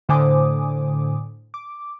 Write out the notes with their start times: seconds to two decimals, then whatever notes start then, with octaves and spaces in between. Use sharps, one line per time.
0.09 A2 D3 C5 G#5 D6 D#6
1.54 D6